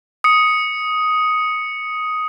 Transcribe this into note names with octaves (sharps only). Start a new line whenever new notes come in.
D#6 C#7